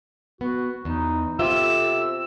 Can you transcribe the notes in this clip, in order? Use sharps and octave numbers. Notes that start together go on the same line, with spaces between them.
B3 F#4
E2 D#4
C3 F4 A4 E6